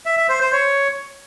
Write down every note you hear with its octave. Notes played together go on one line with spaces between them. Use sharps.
E5
E5
C5
C5
C#5